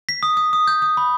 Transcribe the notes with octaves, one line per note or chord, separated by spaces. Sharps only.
B6
D#6
D#6
D#6
G6
D#6
B5